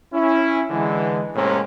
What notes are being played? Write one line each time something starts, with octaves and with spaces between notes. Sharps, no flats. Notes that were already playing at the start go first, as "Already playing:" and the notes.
C#4 E4
D3 E3 G#3
A2 C3 G#3 A#3 C4 C#4